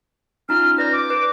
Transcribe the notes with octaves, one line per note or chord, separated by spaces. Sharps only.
C#4 D#4 F4 F6
B4 D5 G6 A#6
D6
B4